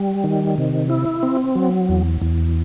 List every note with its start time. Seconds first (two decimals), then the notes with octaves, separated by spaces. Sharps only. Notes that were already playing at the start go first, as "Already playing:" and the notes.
Already playing: G3
0.24 D#3
0.58 C3
0.90 E4
1.23 C4
1.55 F#3
1.89 E2
2.22 E2